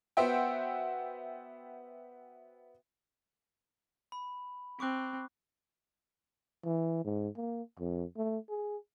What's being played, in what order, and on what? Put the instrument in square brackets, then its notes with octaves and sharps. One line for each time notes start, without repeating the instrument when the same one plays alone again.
[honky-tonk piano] B3 F#4 C5 E5 F#5 G5
[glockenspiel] B5
[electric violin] C4 [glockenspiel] C#6 D6 F#6
[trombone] E3
G#2
A#3
F2
A3
G#4